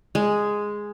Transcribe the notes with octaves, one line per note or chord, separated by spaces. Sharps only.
G#3